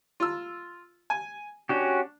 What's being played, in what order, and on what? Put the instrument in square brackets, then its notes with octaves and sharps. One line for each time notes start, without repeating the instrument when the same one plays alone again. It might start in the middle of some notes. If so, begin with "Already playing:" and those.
[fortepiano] F4 E6
G#5
[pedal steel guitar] C#4 F#4 G4 [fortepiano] D4